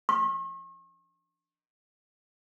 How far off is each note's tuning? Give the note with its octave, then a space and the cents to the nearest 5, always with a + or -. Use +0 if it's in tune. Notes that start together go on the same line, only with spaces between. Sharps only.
C#6 -45